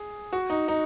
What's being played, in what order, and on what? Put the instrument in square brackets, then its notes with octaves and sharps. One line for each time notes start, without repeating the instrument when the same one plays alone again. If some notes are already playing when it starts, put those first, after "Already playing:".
Already playing: [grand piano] G#4
F#4
D#4
D#4